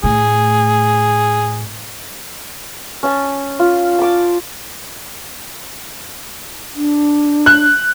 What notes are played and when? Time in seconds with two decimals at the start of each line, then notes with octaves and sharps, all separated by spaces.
0.04 A2 G#4
3.03 C#4 A5
3.59 F4
3.99 A5 D6
6.76 D4
7.46 F#6